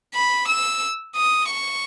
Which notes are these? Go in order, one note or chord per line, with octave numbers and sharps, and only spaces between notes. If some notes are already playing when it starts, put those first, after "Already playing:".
B5
E6
D#6
C#6